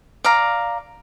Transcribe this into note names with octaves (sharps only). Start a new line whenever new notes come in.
D5 F5 A#5